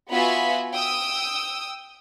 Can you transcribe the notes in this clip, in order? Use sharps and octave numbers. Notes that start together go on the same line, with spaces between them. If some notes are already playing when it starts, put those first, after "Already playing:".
B3 F4 F#4 E5 G#5 B5
G5 D#6 E6